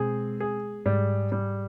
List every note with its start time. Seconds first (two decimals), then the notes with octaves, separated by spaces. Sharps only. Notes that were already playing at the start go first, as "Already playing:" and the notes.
Already playing: B2 G#3 C4 G#4
0.40 G#4
0.86 G#2 G3
1.32 G3